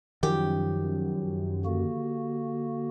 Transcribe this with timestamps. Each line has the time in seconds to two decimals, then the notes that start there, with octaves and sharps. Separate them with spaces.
0.23 F#2 D#3 F3 G4
1.65 D3 A#3 F#4